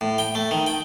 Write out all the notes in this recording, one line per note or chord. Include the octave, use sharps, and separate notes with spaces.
A2
G5
A3
D#3
G5